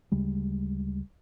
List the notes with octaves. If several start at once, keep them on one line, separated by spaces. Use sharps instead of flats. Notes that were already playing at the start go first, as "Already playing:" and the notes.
D2 C#3 G3 G#3